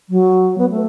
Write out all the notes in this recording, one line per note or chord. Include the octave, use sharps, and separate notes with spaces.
F#3
B3
A3